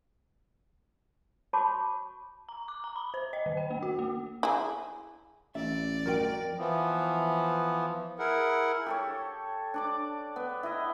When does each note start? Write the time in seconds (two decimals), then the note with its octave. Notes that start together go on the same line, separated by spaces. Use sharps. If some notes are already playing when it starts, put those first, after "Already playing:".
1.53 F#4 C#5 A5 B5 C#6 D6
2.49 A#5
2.68 D6
2.84 A#5
2.96 B5
3.14 C5
3.33 D#5
3.46 D#3
3.57 G5
3.70 A#3
3.83 F#4
3.99 A#3
4.43 E4 G#4
5.55 A1 D5 E5
6.06 F2 F#4 A#4 G5 D7
6.58 E3 F3 B3
8.19 E4 G#4 A#4 F#5
8.86 G4 A4 C#5
9.74 D4 D5 D6
10.36 B3
10.63 E4 D#5